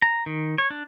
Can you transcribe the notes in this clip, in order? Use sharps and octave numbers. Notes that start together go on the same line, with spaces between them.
A#5
D#3
C#5
D4